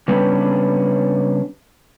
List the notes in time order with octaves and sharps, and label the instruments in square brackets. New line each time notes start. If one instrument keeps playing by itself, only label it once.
[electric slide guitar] C#3 G3 B3 C#4 D4 B4